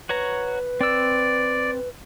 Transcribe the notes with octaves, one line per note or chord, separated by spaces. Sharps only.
F#4 B4 C#5 A#5
C4 D5 E6